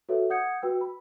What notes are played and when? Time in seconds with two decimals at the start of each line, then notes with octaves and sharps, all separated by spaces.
0.09 F#4 A4 B4 C#5 E5
0.30 F#5 D#6 G6 G#6 C#7
0.62 F#4 B4 G5 E6
0.81 B5